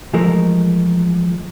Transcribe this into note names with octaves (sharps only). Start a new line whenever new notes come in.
E3 F3 G#3 A3 A#4